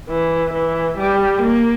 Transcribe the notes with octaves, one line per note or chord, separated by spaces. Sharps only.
E3
E3
G3
A#3